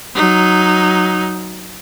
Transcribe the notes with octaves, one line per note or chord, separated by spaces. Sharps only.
F#3 D#4